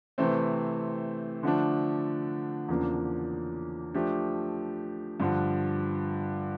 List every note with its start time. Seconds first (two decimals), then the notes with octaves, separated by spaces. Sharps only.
0.18 C3 E3 A3 C4
1.43 D3 F3 A3 D4
2.68 E2 C#3 F3 A#3 D4
3.94 F3 A3 D4 G4
5.20 G2 D3 F3